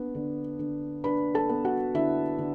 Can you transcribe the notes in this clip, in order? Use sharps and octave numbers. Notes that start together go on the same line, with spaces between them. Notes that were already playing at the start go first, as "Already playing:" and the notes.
Already playing: B3 D4
D3
D3
D4 B4 B5
A4 A5
B3
F#4 F#5
D3 E4 E5
D3